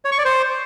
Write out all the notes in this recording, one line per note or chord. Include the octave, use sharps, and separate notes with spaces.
C#5
C#6
D5
C5